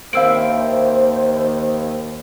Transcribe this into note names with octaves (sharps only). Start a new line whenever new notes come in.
D#2 A#3 C4 E4 C5 F5 E6 D7